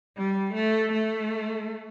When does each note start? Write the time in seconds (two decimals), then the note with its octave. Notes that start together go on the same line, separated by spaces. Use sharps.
0.17 G3
0.54 A3
0.92 A3